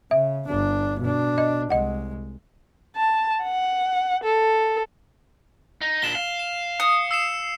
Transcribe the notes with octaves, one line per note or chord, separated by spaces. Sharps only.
C#3 E5
G1 D4
B2 D4
D#5
C2 G#3 D#5 F#5
A5
F#5
A4
D#4
A#2 D4 E7 G7
F5
E7
D#6 C#7
E6 C7 E7